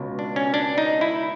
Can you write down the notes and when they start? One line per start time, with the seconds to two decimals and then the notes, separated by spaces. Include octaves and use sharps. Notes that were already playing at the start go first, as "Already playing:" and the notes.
Already playing: C#2 B2
0.19 D4
0.36 C#4
0.54 D4
0.78 D#4
1.01 E4